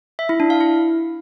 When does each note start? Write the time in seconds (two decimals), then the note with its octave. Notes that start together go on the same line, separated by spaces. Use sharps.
0.19 E5
0.29 E4
0.40 D4
0.50 F5
0.61 E4